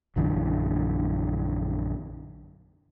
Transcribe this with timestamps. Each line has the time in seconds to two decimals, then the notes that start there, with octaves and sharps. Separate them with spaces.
0.16 A#1 F#2 D3 E3